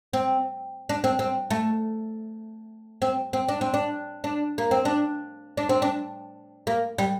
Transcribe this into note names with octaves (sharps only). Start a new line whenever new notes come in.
C4
D4
C4
C4
A3
C4
C4
D4
C4
D4
D4
A#3
C4
D4
D4
C4
D4
A#3
G3